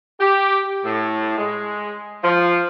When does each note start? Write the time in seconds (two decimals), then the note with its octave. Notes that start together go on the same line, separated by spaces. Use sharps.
0.20 G4
0.84 A2
1.38 G#3
2.24 F3